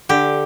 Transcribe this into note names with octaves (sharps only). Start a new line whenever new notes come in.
D3 G4